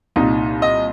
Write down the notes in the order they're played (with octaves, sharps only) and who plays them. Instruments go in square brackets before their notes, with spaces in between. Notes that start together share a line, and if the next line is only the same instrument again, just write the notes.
[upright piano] C2 A#2 D#4
D#5